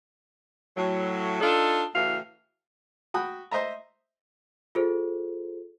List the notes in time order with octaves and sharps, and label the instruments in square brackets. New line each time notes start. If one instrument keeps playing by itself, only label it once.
[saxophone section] A2 F#3
D4 D#4 F4 A4
A2 C#3 E3 F#4 F5
[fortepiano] F#4 G5 B5 D#6 F#6
C5 D#5 E5 A#5
[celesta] F4 G#4 A4 C5